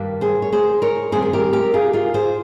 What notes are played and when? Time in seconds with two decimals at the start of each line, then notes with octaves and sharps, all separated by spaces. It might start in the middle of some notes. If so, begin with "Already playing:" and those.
Already playing: G2 D#3 G3 A#3
0.21 G#4 C5
0.42 C#5
0.52 G#4 C5
0.82 A#4 C#5
1.12 G2 D#3 G3 C4 G#4 C5
1.22 G#4
1.33 G4 A#4
1.53 G4 A#4
1.74 F4 G#4
1.93 F4 G#4
2.14 G#4 C5